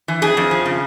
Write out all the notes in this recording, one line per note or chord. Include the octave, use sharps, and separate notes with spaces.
E3
F2 G#4
F2
F3
C#3